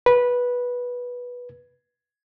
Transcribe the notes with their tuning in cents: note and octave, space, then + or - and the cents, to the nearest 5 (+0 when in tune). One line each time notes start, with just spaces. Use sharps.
B4 -15